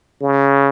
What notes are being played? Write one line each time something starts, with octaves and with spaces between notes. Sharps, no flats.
C#3